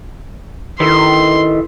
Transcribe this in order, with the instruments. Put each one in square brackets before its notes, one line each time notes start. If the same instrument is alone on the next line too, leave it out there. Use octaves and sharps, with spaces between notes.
[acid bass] D#3 [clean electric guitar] E4 A4 B4 [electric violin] C6